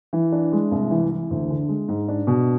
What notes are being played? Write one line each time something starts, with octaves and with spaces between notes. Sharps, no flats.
E3
D4
G#3
C2
E3
E3
D2
D3
G#3
G#2
D4
B2